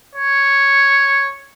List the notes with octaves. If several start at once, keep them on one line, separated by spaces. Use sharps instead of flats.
C#5